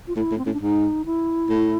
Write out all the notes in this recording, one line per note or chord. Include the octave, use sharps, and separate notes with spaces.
F4
A2 E4
A2
C4
A2 C#4
D4
G#2 D#4
E4
A2